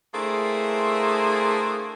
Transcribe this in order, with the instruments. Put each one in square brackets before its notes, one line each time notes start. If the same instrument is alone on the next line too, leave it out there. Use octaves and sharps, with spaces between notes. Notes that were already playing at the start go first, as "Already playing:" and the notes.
[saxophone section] A3 A#3 C4 D4 E4 G#4